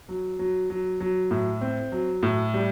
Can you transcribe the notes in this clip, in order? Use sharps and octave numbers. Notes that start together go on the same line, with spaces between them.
F#3
F#3
F#3
F#3
A2
C4
F#3
A2
G3